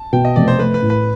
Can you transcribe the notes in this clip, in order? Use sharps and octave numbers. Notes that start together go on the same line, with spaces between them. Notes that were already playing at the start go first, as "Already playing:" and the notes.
Already playing: A5
B2 G5
D#5
F1 D5
C5
A3 B4
B4
A2
B4